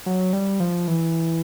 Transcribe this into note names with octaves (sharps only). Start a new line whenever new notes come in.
F#3
G3
F3
E3